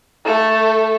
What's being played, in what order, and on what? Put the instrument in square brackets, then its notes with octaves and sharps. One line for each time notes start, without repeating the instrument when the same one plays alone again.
[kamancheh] A3 A4